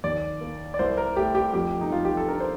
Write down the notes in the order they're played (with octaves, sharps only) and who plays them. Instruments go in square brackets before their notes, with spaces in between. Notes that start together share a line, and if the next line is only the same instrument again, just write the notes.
[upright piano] D#2 [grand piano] D5
[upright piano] A#3
[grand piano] D5
[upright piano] C2 [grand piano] C5
[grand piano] A#4
[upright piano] A3 [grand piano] G4
[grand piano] G4
[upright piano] F2 [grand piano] G4
[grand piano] D#4
[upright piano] F2 [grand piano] F4
[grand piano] G4
A4
[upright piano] D4 [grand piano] A#4
[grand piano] C5